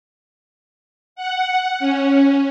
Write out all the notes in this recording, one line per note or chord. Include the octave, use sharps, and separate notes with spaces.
F#5
C#4